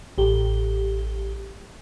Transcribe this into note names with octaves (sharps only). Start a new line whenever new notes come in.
A1 G4